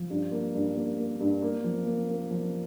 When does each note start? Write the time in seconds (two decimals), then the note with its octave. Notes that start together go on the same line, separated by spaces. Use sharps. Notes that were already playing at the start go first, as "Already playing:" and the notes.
Already playing: F3
0.10 G2
0.32 A#3
0.55 G2
0.76 A#3
0.98 A#3
1.20 G2
1.42 A#3
1.64 F3
1.86 A#3
2.09 A#3
2.31 F3